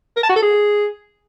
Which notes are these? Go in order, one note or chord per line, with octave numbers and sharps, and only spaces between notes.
A#4
A5
F#4
A4
G#4